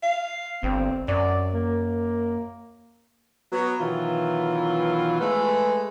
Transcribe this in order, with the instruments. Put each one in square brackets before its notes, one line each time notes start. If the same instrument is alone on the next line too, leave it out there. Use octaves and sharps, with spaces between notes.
[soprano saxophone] F5
[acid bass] G1 [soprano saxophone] C4
[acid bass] F#2 [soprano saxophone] D5
[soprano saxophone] A#3
[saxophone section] F#3 B3 F#4
B2 D#3 E3 F#3 E4 F4
G#3 A3 B4